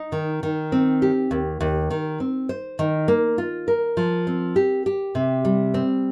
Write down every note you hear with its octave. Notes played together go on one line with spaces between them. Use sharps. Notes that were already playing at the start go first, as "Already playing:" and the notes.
Already playing: D#4
D#3
D#3
C4
G4
D#2
D#2
D#3
C4
C5
D#3
A#3
F4
A#4
F3
C4
G4
G4
C3
G3
C4